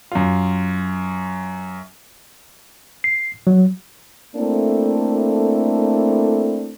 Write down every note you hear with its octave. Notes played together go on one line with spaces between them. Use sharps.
F#2 F4
C7
F#3
A3 A#3 C4 D4 E4 A4